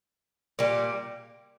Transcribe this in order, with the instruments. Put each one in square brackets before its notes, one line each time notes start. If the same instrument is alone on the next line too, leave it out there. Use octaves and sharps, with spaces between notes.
[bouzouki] A#2 G3 A#3